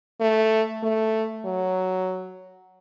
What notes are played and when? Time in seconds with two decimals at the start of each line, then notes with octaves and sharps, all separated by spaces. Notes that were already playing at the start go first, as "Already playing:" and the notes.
0.21 A3
0.83 A3
1.45 F#3